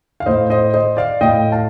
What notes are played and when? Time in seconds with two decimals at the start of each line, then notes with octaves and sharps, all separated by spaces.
0.20 F5
0.26 A2 C5 D#5
0.50 C5 D#5
0.74 C5 D#5
0.97 D5 F5
1.21 A2 D#5 G5
1.52 F5 A5